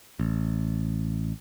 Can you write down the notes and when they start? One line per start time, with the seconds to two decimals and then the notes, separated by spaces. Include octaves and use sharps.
0.19 A1